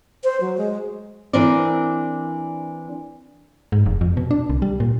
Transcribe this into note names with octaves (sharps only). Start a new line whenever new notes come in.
C5
F#3
G#3
E3 C4 D4 A#4 C5 D5
G#2
F1
F2
B2
D4
C2
G3
A#2